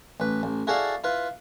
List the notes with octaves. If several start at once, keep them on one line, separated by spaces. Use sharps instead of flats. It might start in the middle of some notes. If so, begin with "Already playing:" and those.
A1 B4
A1
E4 F#4 G#4 A4 D5 F5
E4 F4 B4